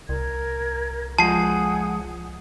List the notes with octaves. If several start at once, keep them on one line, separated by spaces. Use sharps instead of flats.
C2 A#4 G#6
F3 G#3 F#5 G#5 A5 D#6 C7